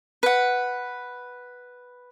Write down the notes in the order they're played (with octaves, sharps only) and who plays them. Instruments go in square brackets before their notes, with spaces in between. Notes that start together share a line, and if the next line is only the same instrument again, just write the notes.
[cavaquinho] B4 F#5